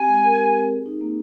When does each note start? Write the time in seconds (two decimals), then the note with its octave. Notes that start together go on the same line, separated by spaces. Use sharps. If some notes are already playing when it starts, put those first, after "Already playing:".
Already playing: C4 G4 G#5
0.08 G#3
0.23 A#4
0.39 G4
0.54 C4
0.70 G#4
0.86 D#4
1.01 A#3